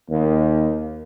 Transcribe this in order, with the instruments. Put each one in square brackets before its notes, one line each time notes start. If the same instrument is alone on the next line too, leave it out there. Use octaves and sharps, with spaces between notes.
[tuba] D#2